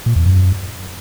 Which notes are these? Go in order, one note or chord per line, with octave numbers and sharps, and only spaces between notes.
A#2
E2
F#2